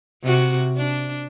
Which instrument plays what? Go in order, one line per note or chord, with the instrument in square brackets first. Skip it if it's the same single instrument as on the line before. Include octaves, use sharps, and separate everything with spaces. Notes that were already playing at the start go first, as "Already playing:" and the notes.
[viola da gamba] C3 F#4
D4